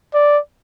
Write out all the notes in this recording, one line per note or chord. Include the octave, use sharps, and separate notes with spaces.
D5